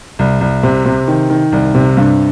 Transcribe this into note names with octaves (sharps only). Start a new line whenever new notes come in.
C2
C2
C3
C3
D#3
D#3
C2
C3
G2